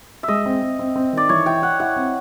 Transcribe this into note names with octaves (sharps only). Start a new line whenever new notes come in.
E5
G#3 D#5
C4
C4
C4
C4
D#3 D5
E3 C#5
E4 G5
E4 F#5
E4 F#5
C4